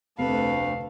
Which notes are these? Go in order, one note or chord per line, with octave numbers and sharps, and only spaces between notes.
F1 D2 A4 B4 F5